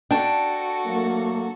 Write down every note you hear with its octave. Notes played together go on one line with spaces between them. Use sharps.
D4 F#4 A4 G5 A5
F#3 A3 A#3